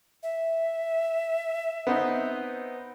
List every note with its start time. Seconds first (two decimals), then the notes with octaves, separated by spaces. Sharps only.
0.23 E5
1.87 B3 C4 D#4